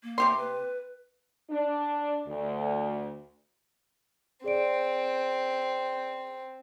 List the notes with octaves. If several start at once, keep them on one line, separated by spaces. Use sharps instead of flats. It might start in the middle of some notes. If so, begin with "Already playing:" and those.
A#3
C3 G4 C6
B4
D4
D2
C4 G#4 D5 D7